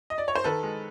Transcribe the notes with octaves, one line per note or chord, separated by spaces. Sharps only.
D#5
D5
C#5
C5
D#3 A4 B4
G#3